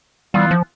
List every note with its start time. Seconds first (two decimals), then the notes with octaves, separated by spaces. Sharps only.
0.34 E3 G3 B3 F4
0.51 F3